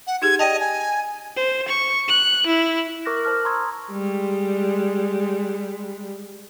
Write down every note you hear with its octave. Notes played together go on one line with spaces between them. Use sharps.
F#5
D#4 G4 G#4 G#6
D5 D#5 G5 A5
G#5
C5
C#6
F#6
E4
A#4 C#6 D6 F6 F#6 A#6
C5 A5 F6
A#5 C6 C#6 D#6 E6 G#6
G3 G#3